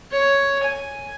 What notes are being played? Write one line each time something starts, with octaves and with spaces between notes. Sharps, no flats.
C#5
G#5